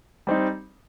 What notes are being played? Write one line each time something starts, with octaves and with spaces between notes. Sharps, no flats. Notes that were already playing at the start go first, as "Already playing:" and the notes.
G3 C4 D#4